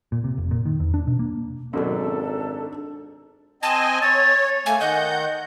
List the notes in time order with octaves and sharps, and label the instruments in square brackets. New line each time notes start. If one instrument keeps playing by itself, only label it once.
[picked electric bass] A#2
C3
F1
A#2
D#3
E2
D4
B2
A#3
[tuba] G#1 [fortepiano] F#2 B2 [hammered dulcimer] D4 D#4 [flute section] A4
[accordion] C4 D#5 G#5 [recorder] A5
[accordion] C#5 [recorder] A6
[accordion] A3 A#3 [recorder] G#5
[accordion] D#3 F#5 G6 [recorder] D#5